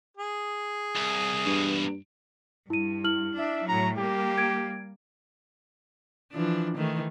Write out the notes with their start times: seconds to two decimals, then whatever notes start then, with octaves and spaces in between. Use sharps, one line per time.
0.17 G#4
0.96 C2
1.46 E2 G2 B2
2.70 G2 E4 D#7
3.04 E4 F6 F#7
3.38 D4 E5
3.68 A2 F#3 A#5
3.98 G3 A#3 G4
4.38 G#6 D7
6.32 E3 F3 D4
6.77 D#3 E3 A3